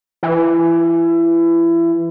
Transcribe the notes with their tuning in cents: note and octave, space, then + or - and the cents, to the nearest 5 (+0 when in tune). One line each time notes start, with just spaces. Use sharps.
E3 +25